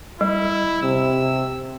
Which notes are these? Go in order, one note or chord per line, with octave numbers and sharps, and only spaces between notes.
G3 E4
C3 E6